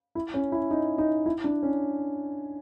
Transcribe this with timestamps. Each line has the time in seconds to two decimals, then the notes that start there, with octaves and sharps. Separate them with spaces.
0.15 E4
0.34 C#4
0.52 E4
0.71 D#4
0.98 D#4
1.26 E4
1.44 D4
1.63 C#4